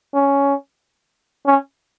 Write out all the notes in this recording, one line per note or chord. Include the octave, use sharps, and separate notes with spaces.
C#4
C#4